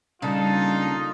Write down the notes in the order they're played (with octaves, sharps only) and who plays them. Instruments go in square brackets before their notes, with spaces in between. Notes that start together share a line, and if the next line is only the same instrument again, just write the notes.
[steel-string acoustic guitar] C#3 D4 [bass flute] G3 [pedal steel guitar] A#3 A4 A5 [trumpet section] D#4 F4